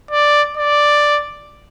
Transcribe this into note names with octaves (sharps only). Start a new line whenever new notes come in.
D5
D5